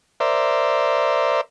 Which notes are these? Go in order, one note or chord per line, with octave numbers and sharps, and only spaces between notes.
A#4 C5 D5 E5